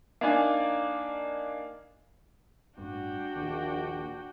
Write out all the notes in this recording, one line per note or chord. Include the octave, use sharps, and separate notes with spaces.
A#3 D4 D#4 D5 G#5
A1 G2 D4 F#4 G5
A#1 D#2 A#2